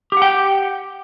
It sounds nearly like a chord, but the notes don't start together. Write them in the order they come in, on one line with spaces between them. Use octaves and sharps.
G4 F#5 G5